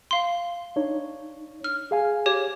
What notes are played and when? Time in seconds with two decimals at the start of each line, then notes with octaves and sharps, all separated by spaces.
0.11 F5 C6
0.76 D4 D#4 C#5
1.64 F6
1.91 G#4 F5 G#5
2.26 G4 C#5